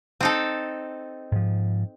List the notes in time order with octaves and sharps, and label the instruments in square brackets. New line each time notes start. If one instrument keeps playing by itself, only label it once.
[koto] C4 D#4 A4
[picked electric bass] G#2 F3